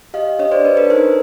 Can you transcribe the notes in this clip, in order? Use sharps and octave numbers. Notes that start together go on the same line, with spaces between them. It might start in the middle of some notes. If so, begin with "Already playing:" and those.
G4 D#5 F5
D4 C#5 D#5
C5 D5
D4 B4 C#5
A4 B4
D#4 A#4 C5